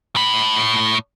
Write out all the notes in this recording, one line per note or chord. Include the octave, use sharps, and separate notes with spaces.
A2 B5